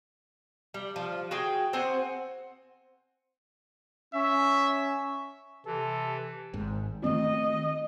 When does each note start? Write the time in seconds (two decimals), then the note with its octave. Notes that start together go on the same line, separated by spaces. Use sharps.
0.74 G3
0.96 F3
1.31 F#4 G#4 G5
1.73 C4 C5 F#5 G#5
4.14 C#4 E5
5.66 C3 E3 A4
6.54 G#1 G#2
7.04 D#3 A3 C4 D#5